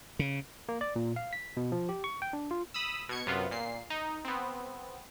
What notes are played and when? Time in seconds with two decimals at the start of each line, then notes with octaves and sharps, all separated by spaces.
0.19 C#3
0.69 A#3
0.81 D5
0.96 A#2
1.16 F5
1.33 B6
1.57 B2
1.72 F3
1.89 G4
2.04 C#6
2.22 G5
2.33 D4
2.51 F4
2.74 B5 D#6 E6
3.09 B2 G#6 C#7
3.26 F#2 C3 B3 F4
3.51 A#2 C7
3.90 D#4
4.25 B3 C4